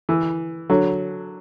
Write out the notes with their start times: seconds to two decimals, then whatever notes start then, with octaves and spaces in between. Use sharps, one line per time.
0.09 E3
0.70 D3 F#3